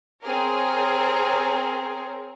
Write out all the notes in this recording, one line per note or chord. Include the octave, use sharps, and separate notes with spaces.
C4 G#4 A#4 C#5